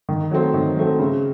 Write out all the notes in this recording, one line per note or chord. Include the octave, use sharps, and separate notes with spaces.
D#3
F#3 A3 C4
D#3
F#3 A3 C4
C#3